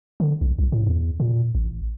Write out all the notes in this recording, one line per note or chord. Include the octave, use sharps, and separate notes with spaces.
D3
B1
C2
A2
E2
A#2
A1